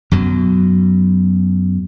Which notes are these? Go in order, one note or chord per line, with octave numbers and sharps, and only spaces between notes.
F#2 B2 F#3